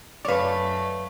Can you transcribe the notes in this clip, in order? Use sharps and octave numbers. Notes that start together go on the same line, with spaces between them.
F#2 A3 B4 C#5 D5 F5